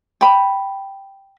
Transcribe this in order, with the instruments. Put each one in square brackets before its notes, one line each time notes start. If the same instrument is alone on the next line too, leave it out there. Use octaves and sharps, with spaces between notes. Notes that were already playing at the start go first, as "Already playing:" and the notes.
[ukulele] G5 B5